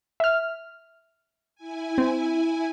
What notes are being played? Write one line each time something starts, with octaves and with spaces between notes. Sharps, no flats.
E5 F6
E4 G#5
C4